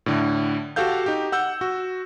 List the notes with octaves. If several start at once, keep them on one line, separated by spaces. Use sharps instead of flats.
A2 D3
F#4 G4 A4 F5 G6
D#4 G4
F#5 E6 G6
F#4